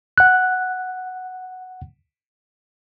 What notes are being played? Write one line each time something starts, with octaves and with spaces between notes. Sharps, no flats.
F#5 F#6